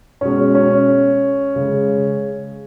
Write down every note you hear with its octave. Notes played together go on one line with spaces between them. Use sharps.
B2 G#3 C#4
C#4
C#3 G#3